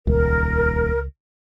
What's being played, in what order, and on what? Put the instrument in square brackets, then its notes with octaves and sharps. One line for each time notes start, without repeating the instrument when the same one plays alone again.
[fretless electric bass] D#1 [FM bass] C#2 [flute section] A#4